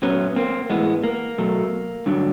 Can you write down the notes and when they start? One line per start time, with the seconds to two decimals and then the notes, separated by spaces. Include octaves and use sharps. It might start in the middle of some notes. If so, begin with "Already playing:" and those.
0.02 A#2 F#3 A3 B3 C#4
0.36 A#3 C4
0.70 A2 E3 G#3 B3
1.04 A#3
1.38 B2 F#3 A3
2.06 G2 D3 F#3